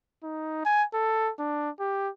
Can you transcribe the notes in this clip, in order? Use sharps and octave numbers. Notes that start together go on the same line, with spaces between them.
D#4
G#5
A4
D4
G4